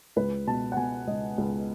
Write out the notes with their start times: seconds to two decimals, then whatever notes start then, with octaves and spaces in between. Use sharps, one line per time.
0.16 C#2 B4
0.47 B2 A5
0.72 F#5
0.77 B2 G#5
1.07 C#2 D#5
1.38 C#2